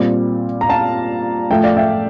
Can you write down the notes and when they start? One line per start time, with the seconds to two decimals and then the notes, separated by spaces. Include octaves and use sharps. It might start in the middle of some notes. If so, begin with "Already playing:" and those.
Already playing: A#2 G3 C4
0.61 A#5
0.69 F5 A5
1.50 A2 F3 A3 E5 G5
1.64 D5 F5
1.77 E5 G5